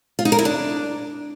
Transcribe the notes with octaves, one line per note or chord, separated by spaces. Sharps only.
F4
D#4
A#4
E4
D4